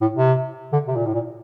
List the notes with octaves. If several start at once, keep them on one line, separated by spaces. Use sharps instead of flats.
A2
C3
D3
C3
A#2
A2
A#2